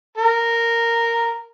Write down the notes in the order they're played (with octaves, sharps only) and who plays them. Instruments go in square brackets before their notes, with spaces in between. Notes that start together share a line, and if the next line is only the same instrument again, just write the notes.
[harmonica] A#4